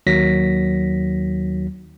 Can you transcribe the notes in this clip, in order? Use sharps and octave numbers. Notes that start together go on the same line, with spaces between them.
D#2 D#3 F#3 A#6 B6